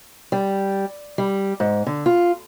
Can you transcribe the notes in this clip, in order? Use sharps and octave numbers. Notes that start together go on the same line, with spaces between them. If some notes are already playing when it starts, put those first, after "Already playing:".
G3
G3
G#2
D3
F4